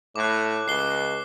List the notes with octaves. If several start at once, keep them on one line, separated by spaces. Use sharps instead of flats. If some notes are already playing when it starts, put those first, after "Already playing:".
A2 D6 F#6
C#2 C7 G7